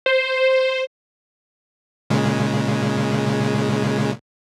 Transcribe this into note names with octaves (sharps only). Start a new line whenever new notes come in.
C5
A#2 C#3 G#3